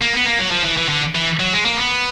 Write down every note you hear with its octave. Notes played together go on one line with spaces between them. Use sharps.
A#3
B3
A#3
F#3
F3
E3
E3
D3
E3
F#3
G#3
A#3
B3